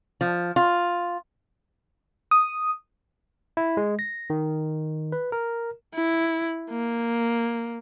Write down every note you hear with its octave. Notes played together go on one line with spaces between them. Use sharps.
F3
F4
D#6
E4
G#3
A#6
D#3
B4
A#4
E4
A#3